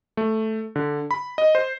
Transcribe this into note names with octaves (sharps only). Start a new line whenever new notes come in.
A3
D3
B5
D#5
C5